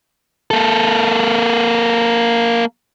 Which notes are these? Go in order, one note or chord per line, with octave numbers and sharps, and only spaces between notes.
A#3 A4